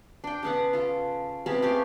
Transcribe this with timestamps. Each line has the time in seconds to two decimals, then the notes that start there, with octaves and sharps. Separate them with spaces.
0.24 D4 G5
0.43 C#3 B3 F#5
0.73 F4 A4
1.46 C3 G#3 B3 C#4
1.62 A3 G4 F5